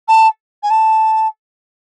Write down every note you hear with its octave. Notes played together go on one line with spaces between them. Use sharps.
A5
G#5
A5